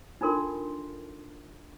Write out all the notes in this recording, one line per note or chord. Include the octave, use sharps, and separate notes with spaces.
D4 D#4 F4 A4 A#4 C6